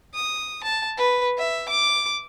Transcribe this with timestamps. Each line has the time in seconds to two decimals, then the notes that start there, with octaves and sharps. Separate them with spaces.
0.14 D#6
0.64 A5
0.97 B4
1.38 E5
1.69 D6